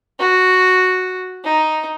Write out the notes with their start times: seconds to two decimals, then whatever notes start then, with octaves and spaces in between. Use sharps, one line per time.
0.19 F#4
1.44 D#4